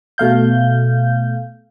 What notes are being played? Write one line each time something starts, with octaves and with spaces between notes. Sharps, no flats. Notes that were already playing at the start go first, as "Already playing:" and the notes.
B2 A3 F5 G6